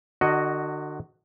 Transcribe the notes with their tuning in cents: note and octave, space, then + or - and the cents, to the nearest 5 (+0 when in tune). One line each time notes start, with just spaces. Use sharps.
D3 +35 F#4 +5 D#5 +0